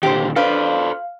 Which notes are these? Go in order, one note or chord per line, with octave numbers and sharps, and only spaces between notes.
A#2 D3 D#3 G4 C5
D4 A4 B4 C5 F5